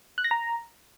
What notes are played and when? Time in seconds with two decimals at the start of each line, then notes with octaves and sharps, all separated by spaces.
0.18 F#6
0.24 A#6
0.31 A#5